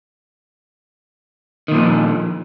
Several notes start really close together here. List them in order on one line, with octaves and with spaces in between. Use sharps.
D#3 A#2 F3